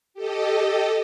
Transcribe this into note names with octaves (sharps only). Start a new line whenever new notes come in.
G4 A4 D#5